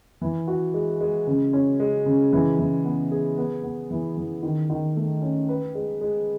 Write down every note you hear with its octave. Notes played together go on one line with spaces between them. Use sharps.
E3
F#4
G#3
G#3
C#3
C#4
G#3
C#3
E3
E3
B3
G#4
B3
B3
E3
E3
D#3
D#3
A3
C#4
B4
G#3
G#3